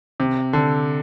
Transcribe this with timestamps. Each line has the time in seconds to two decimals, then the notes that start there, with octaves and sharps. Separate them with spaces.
0.20 C3
0.53 D3